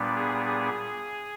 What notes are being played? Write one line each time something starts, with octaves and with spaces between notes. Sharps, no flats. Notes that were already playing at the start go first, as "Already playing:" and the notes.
Already playing: A#2 G3 B3 D4
G#4
G#4